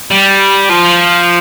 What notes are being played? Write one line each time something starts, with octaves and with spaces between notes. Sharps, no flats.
G3
F3